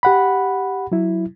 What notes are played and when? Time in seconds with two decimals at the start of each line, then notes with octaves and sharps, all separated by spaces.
0.03 G4 F#5 B5
0.92 F#3 E4